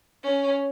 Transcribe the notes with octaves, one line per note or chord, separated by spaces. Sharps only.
C#4